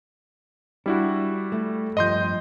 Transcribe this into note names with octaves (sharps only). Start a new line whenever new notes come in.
G3 D4 E4 F#4
A3
G2 F3 D#5 C6 G6